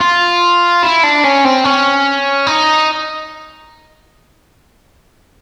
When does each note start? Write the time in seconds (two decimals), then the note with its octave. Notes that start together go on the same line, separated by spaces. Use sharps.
0.01 F4
0.83 E4
1.03 D4
1.24 C#4
1.45 C4
1.64 C#4
2.47 D#4